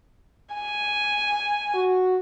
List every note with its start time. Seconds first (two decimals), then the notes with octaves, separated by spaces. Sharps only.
0.55 G#5
1.75 F#4